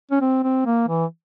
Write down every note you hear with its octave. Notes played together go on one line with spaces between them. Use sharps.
C#4
C4
C4
A#3
E3